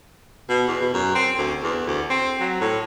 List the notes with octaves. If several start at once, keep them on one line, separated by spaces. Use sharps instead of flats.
B2
E2
B2
F#2
C4
D2
E2
D2
C4
F#3
A2